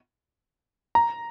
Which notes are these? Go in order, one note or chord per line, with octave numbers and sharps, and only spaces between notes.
A#5